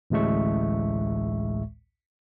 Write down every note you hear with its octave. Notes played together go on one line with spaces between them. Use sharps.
A1 D2 A2 G#3 E5 C#6